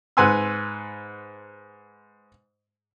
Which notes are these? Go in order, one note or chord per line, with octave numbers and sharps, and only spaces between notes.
G#2 B4 F#5 G#5 C6 E6